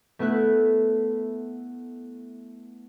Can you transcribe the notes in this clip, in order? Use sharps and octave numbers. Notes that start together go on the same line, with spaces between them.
A3 B3 E4 E5 F#6